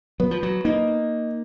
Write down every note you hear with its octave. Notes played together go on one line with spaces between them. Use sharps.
F#3 B3
F3
F#3
A#3 D#4